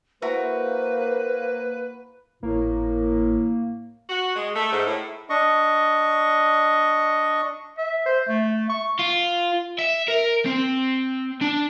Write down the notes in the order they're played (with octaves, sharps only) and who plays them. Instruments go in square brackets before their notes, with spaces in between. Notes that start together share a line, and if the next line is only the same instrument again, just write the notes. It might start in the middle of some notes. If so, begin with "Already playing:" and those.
[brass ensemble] A#3 [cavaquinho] E4 F#4 A#5 [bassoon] B4 [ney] C5
[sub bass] G#1 [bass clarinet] A2 [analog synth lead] A#3
[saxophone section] F#4
G#3
A3
G#2
A2
[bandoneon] D4 D#5 C#6
[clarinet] E5
C5
A3
C#6
[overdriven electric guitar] F4
E5
A#4
C4
D4